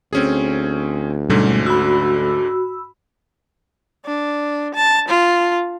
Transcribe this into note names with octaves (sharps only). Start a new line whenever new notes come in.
D2 C4 C#4 G#4
G#2 B2 D3 G3 A3 C#4
F#4 B5 E6
D4
A5
F4